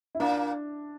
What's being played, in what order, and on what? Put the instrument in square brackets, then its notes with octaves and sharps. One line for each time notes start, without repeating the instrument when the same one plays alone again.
[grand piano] E4
[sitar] A#2 A#3 [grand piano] D4